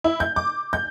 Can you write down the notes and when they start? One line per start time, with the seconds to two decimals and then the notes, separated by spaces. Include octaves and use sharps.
0.04 E4
0.20 G6
0.36 D6
0.73 G6